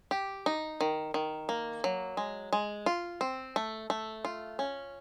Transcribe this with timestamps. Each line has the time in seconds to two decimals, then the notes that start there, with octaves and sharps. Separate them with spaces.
0.11 G4
0.46 D#4
0.81 D#3
1.14 D#3
1.49 A#3
1.84 F#3
2.17 G#3
2.53 G#3
2.86 F4
3.21 C4
3.56 A3
3.90 A3
4.25 F4
4.59 C#4